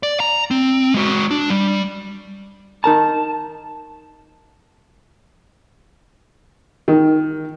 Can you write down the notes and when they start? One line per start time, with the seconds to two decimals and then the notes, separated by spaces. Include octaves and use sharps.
0.03 D5
0.20 A#5
0.51 C4
0.94 G#3 F#4
1.31 D4
1.50 G3
2.84 D#4 A#4 A5 A#5
6.88 D#3